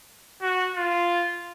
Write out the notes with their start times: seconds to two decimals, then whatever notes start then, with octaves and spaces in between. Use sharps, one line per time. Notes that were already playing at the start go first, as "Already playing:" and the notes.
0.42 F#4
0.76 F4